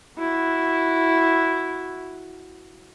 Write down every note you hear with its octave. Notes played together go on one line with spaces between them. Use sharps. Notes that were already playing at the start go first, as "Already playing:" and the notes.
E4 F#4